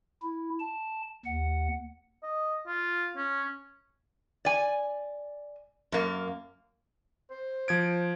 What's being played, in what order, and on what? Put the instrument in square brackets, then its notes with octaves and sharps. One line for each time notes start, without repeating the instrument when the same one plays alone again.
[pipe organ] E4
A5
D#2 F#5
[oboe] D#5
F4
C#4
[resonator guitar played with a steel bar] D5 G#5
F#2 A#3
[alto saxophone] C5
[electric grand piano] F3 G#6 D7